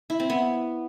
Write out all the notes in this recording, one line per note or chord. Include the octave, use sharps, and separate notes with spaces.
E4
C4
B3